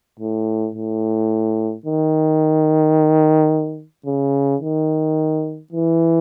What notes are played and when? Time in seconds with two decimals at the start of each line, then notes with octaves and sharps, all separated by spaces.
0.20 A2
0.75 A2
1.86 D#3
4.06 C#3
4.61 D#3
5.72 E3